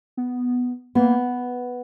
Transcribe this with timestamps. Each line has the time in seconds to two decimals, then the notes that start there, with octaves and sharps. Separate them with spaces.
0.17 B3
0.95 A#3 B3